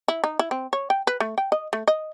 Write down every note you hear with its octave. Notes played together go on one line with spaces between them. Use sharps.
E4
D#4
E4
C4
C#5
G5
B4
A3
G5
D#5
A3
D#5